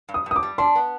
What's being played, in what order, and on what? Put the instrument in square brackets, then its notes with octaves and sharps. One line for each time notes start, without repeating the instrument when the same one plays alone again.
[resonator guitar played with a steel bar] G2
[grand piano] D#6
[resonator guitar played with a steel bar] G2 [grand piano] D#6
[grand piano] D6
[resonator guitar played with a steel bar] G3
[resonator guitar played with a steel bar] D4 [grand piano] C6
[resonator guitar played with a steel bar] B3